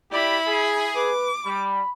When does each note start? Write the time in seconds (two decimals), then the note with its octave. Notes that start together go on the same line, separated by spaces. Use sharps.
0.12 E4 G4 D5 B5
0.48 G#4
0.96 B4 D6
1.46 G3 B5